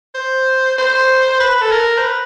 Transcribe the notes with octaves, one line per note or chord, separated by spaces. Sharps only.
C5
C5
B4
B4
A4
A#4
C5
B4